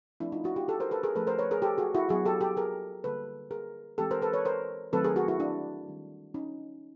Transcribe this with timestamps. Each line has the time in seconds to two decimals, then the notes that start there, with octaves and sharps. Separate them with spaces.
0.20 F3 A3 C4 D4 E4
0.32 D#4 F4
0.44 E4 F#4
0.56 F4 G4
0.68 G4 A4
0.80 A#4 C5
0.91 A4 B4
1.03 G#4 A#4
1.15 F3 A3 C#4 A4 B4
1.27 A#4 C5
1.39 B4 C#5
1.51 G#4 A#4
1.62 G4 A4
1.78 F#4 G#4
1.95 E4 F#4
2.09 F#3 B3 F#4 G#4
2.25 G4 A4
2.41 G4 A4
2.57 G#4 A#4
3.04 D3 G3 A#3 A4 B4
3.51 G#4 A#4
3.98 E3 G#3 C4 G4 A4
4.11 A#4 C5
4.22 A4 B4
4.33 B4 C#5
4.45 A#4 C5
4.92 D#3 F#3 A3 C4 A4 B4
5.04 G#4 A#4
5.16 F#4 G#4
5.28 E4 F#4
5.40 D4 E4
5.88 D#3 G3 C4
6.34 C#4 D#4